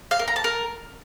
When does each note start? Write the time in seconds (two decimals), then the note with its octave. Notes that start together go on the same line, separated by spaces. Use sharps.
0.11 F5
0.19 A#4
0.28 A#5
0.36 A5
0.44 A#4